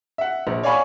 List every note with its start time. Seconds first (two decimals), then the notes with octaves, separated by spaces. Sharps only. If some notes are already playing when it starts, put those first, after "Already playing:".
0.18 E5 F#5
0.47 A#1
0.63 C#5 D5 F5 G#5 B5 C#6